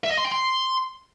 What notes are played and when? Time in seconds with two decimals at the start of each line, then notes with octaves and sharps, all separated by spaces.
0.04 E5
0.11 D#5
0.18 C6
0.24 G5
0.31 C6